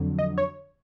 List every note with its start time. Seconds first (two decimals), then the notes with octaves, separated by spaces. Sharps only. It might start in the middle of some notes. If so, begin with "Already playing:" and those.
Already playing: F2 D3 F#3
0.19 D#5
0.38 C#5